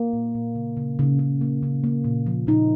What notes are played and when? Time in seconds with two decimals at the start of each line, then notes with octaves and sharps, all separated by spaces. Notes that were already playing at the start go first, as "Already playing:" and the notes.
Already playing: A#3
0.13 A#2
0.35 A#2
0.55 C#3
0.77 C#3
0.99 C#3
1.19 C#3
1.41 A#3
1.63 C#3
1.84 A#3
2.04 A#2
2.27 F3
2.47 A#2 D#4